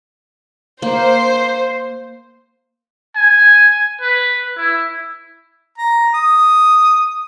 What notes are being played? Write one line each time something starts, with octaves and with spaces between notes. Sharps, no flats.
A#3 C5
G#5
B4
E4
A#5
D#6